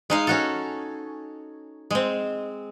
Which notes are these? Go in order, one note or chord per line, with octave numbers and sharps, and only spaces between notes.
G#3 D#4 F5
C#4 F#4 A4
G#3 C4